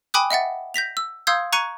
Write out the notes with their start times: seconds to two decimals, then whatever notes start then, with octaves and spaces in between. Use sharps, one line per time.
0.14 G5 G#5 B5 D6 D#6 F#6
0.30 D#5 E5 F#5 A6
0.74 G6 A#6 B6 F7
0.97 E6
1.27 F5 C6 D#6 E6 G6 G#6
1.53 A#5 C#6 F#6 G#6 C#7 D#7